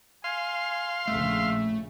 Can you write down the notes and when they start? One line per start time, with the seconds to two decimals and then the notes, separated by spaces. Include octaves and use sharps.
0.24 F5 G#5 C6
1.07 A#1 C#3 A3 E5